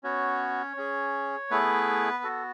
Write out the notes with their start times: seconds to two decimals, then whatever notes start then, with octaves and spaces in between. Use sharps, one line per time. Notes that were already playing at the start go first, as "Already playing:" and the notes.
0.04 B3 C#4 F#4 C#5
0.77 C#4 G#4
1.50 A3 B3 E4 G#4 B4
2.24 B3 F#4 A4